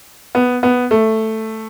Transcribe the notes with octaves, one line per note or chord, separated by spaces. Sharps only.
B3
B3
A3